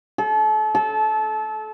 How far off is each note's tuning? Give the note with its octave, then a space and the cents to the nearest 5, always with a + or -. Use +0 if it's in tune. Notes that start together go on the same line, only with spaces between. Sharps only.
A4 -35
A4 -25